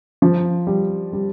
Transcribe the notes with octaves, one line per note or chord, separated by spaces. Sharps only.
F3
G3
G3